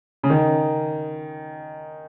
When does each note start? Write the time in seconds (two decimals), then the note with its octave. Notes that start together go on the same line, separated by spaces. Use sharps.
0.23 C#3
0.30 D#3